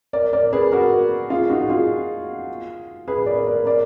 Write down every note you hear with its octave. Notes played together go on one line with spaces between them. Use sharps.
A#4 D5
A#4 D5
G#4 B4
F#4 A#4
F4 G#4
D#4 F#4
F4 G#4
G#4 B4
A#4 D5
A#4 D5
A#4 D5